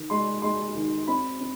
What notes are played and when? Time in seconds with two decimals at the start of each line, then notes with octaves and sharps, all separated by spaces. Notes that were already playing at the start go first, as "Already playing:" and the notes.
Already playing: D#3
0.10 G#3 C6
0.42 G#3 C6
0.75 D#3
1.07 C4 B5
1.40 C4